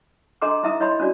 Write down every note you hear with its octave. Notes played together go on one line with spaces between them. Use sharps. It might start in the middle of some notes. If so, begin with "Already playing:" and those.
D4 A4 D#5 A#5 C6 D6
D#4 E4 E5 A5 A#5 D#6
E4 C#5 D#5 B5 C6
C#4 D4 F#4 D5